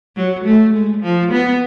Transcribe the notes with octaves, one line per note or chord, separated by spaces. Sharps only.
F#3
A3
G#3
F3
B3